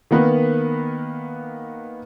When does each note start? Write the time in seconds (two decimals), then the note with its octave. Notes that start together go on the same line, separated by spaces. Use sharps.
0.11 D#3 A#3 B3 B4